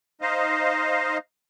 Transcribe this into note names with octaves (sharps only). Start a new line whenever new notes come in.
D#4 C5 D#5 F5